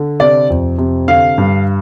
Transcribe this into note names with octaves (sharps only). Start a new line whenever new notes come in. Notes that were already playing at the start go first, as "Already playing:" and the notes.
Already playing: D3
C3 D5
F2
C3
D3 F5
G2